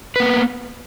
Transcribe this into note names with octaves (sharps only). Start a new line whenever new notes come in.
A#3 B3 B4